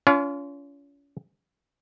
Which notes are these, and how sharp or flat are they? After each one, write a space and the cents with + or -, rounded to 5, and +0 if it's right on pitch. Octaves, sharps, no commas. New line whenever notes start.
C#4 +35 F4 -20